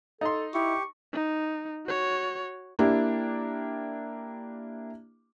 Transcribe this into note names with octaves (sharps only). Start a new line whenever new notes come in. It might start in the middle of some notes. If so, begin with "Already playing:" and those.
D#4 A4 C6
E4 G4 C#6
D#4
F#4 C#5
A#3 D4 E4 G4